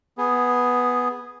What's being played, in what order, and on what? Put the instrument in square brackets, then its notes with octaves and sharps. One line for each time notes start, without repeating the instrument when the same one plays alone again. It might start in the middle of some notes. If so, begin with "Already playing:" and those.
[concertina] B3 G#4